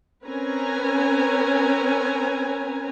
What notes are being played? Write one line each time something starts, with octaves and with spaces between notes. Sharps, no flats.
C4 C#4 A#4 B4 G#5 A#5